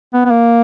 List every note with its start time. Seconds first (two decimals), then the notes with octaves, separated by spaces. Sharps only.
0.14 B3
0.25 B3
0.31 A#3